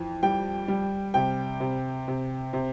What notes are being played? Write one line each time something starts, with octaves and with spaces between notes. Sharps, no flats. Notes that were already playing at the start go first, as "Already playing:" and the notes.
Already playing: F2 E3
G3 G5
G3
C3 G5
C3
C3
C3